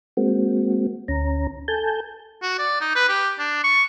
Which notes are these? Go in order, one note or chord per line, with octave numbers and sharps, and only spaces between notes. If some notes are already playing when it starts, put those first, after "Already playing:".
G#3 A#3 C4 F#4
D2 C#4 A#5
A4 G#5 A5 G6
F#4
D5
D#4
B4
G4
D4
C#6